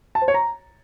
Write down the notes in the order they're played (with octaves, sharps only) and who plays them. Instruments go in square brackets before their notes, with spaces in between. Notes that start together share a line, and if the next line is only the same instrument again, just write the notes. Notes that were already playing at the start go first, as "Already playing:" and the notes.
[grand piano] A5
C5
C#5
A#5